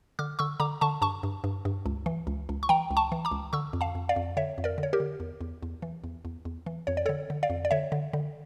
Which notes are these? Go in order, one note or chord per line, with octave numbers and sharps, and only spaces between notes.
D3 D6 F6
D3 C#6 E6
D3 A#5 D6
D3 A5 C#6
G2 A5 C#6
G2
G2
G2
C#2
E3
C#2
C#2
C#6
E3 G5 A#5
C#2
A5 C#6
E3
A#5 D6
C#2
D3 C#6 E6
F2
F5 A5
F2
D5 F5
F2
D3 C#5 E5
F2
A#4 D5
D3
C#5
G4 A#4
D3
E2
E2
E2
E3
E2
E2
E2
E3
F2 C#5
D5
D3 A4 C#5
D3
D5 F5
F2
D5
D3 C#5 E5
D3
D3